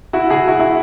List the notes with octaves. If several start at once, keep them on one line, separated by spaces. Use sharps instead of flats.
E4 F#4
F#4 G#4
E4 F#4
E4 F#4